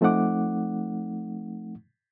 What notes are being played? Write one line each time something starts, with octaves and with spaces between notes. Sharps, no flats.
F3 A3 C4 D#4 F#5 D6